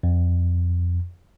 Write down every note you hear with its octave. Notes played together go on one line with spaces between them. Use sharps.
F2